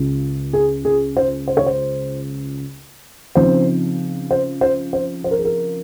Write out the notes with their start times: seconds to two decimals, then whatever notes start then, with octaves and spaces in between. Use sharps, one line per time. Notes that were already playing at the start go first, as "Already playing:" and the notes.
Already playing: C#2 C#3 G#3 C#4 F4
0.53 G#4
0.85 G#4
1.17 C5
1.48 C5
1.57 C#5
1.66 C5
3.35 C#3 F3 C4 D#4 C5
4.31 C5
4.61 C5
4.93 C5
5.24 C5
5.31 A#4
5.39 G#4
5.45 A#4